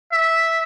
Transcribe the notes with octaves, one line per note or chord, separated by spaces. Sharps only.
E5